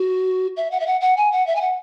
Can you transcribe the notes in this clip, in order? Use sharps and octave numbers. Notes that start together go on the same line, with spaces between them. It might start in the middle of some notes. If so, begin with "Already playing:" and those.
Already playing: F#4
E5
F#5
E5
F#5
F#5
G#5
F#5
E5
G#5
F#5